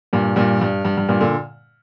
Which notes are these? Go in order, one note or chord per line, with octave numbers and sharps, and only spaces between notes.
G2 A#2
G2 A#2
G2
G2
G2
G2 A#2
A#2 D3